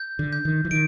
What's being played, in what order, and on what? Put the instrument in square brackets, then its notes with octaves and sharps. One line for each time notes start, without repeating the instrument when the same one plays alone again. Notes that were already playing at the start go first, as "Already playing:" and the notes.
Already playing: [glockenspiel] G6
[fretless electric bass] D3
[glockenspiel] G6
[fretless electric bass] D#3
E3
[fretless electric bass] D#3 [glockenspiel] D7